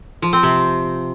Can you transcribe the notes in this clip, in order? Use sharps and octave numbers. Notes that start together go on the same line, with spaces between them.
F3
C4
C3